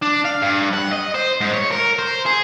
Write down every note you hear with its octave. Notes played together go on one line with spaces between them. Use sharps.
D4
F5
G2
F#5
D#5
C5
G#2
C#5
A#4
C5
G#4